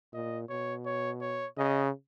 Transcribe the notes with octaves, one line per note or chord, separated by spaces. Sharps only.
A#2 D#5
B2 C#5
C#5
C#5
C#3 D#5